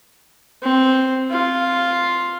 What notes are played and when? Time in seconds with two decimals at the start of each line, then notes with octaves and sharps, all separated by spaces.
0.63 C4
1.30 F4